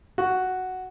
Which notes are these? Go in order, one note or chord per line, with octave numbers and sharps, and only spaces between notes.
F#4